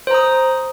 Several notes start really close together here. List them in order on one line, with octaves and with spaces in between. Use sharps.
C5 A#5 D#6